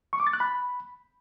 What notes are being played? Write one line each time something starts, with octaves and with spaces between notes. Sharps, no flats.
C#6
D6
A6
F#6
B5